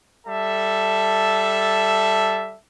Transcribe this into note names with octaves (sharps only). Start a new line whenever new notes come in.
G3 A4 E5 A5